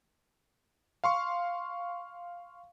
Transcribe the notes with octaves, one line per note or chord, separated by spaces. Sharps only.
F5 C6 C#6